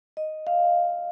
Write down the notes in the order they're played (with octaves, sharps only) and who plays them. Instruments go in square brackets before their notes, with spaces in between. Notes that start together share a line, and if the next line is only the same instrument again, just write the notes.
[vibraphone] D#5
F5